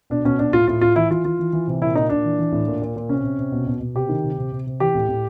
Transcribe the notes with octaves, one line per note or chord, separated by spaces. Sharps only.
B2 D4
B2 C#4
B2 D4
A2 F4
A2 F4
A2 F4
E3 E4
E3 F4
E3 F4
E3
E3
C3
A#2 E4
A#2 D#4
A#2 D4
E3
E3
A2
A#2
A#2
A#2
C3 C#4
C3
C3
B2
B2
B2
C3 G4
D#3
C3
C3
C3
C3
E3 G4
A2
A2